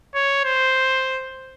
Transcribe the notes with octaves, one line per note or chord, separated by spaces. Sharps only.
C#5
C5